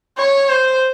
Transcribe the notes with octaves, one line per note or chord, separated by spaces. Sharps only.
C#5
C5